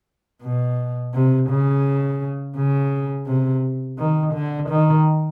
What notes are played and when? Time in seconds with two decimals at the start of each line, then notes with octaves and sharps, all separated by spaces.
0.42 B2
1.14 C3
1.50 C#3
2.56 C#3
3.27 C3
3.99 D#3
4.34 D3
4.70 D#3